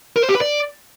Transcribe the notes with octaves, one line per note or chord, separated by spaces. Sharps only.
A#4
C5
G4
B4
D5